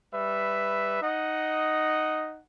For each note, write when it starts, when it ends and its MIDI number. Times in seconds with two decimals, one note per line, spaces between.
0.13 0.99 55
0.13 0.99 71
0.13 0.99 76
1.02 2.41 63
1.02 2.41 75
1.02 2.41 78